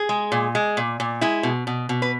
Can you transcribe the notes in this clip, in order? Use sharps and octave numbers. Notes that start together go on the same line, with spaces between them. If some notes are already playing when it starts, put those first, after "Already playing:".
Already playing: G#4
G#3
A#2
G#3
A#2
A#2
G#3 E4
B2
B2
B2
B4